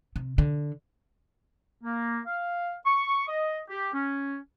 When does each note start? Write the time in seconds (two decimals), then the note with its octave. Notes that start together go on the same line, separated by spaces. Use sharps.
0.16 C3
0.38 D3
1.84 A#3
2.27 F5
2.86 C#6
3.28 D#5
3.70 G4
3.94 C#4